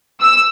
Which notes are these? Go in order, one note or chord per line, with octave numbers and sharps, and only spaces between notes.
E6